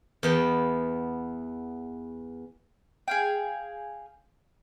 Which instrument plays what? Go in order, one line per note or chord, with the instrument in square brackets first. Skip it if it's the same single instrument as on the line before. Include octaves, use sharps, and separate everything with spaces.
[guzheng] E2 B3 G5
[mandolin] G#4 F5 G5